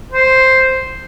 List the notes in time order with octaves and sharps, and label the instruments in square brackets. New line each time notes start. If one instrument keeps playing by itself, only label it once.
[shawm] C5